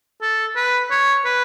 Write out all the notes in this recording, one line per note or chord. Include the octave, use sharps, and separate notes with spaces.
A4
B4
C#5
B4